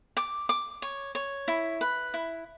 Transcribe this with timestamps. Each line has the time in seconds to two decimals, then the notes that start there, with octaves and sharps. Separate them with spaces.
0.17 D6
0.49 D6
0.82 C#5
1.15 C#5
1.48 E4
1.81 B4
2.14 E4